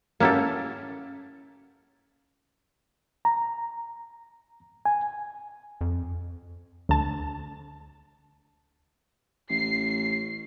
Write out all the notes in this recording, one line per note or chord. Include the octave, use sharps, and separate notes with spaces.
A#3 C#4 E4 G4 A4
A#5
G#5
F2
D2 A5
A1 C7